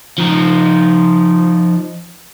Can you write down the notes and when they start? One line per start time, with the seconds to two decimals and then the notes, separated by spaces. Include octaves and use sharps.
0.18 F3 D#4